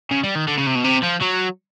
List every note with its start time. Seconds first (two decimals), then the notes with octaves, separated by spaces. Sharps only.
0.11 C#3
0.24 G3
0.35 D#3
0.48 D3
0.58 C#3
0.67 C3
0.75 B2
0.84 C3
1.03 F3
1.22 F#3